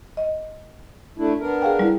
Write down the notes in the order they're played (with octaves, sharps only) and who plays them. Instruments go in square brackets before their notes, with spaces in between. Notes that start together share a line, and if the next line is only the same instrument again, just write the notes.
[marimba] D#5
[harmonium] A3 D4 E4
B3 D4 A#4
[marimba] G#4 F5 G5
G3 E4